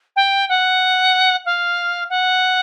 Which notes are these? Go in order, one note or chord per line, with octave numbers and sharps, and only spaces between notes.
G5
F#5
F5
F#5